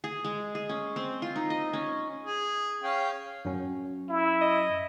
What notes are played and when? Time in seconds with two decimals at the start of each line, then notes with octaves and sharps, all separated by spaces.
0.04 G#4
0.24 G#3
0.55 G#4
0.69 C#4
0.96 C4
1.22 F4
1.36 D#4
1.50 D#5
1.73 C#4
2.25 G#4
2.83 C#4 F5 G5
3.45 F#2 F#3 C#4
4.09 E4
4.41 D#5